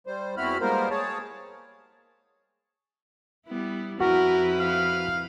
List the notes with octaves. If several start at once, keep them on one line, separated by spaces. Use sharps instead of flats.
G3 C5
E2 C4 E4 F#4 B5 F6
G3 G#3 A#3 B3 A#4 C5
G#4 C#5 A5
G3 B3 E4
F2 E4 F#4 A#4 B4
F5